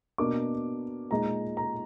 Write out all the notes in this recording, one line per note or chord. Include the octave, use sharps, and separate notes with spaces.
B2 A#3 D4 D6
A#2 G#3 D#4 A#5
A#5